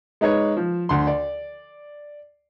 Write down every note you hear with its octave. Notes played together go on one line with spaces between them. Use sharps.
G#3 D#4 B4 C#5
F3
D2 C6
D5